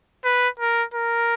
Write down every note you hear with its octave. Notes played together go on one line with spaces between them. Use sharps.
B4
A#4
A#4